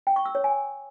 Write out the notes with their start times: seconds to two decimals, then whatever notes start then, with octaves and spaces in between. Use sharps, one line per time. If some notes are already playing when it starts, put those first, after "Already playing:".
0.07 G5
0.16 C#6
0.25 E6
0.35 C#5
0.44 G#5